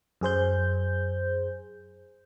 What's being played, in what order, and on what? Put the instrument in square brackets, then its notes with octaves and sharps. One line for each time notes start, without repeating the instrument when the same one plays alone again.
[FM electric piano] F#2 G#4 C5 G6